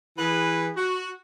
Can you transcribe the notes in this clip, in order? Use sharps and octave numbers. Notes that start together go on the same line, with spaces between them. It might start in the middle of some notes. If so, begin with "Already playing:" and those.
E3 G#4 B4
F#4